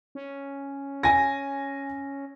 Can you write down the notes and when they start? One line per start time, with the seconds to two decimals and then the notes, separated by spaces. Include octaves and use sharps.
0.15 C#4
1.03 G#5 A#6